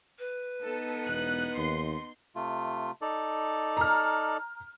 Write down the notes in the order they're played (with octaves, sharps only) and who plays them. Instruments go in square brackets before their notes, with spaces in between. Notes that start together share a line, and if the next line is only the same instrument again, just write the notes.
[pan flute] B4
[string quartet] B3 D#4 [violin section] A4
[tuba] E1 [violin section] F#6
[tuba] D#2 [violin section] C6
[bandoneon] C3 A3 F4
D#4 A4 D5
[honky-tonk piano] A#5 F6